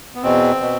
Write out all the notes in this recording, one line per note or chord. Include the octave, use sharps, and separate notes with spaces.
B3
E2 B2 C4
B2